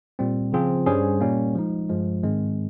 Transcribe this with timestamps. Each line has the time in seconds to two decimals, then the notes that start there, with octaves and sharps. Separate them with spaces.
0.19 A#2 G3 C4
0.52 C#3 F3 C4 F4 G#4
0.86 G2 G3 C#4 G#4 C5
1.21 A#2 G3 A#3 C#4
1.55 F3 G#3 D#4
1.89 G2 F3 G#3
2.23 G#2 D#3 G#3 C4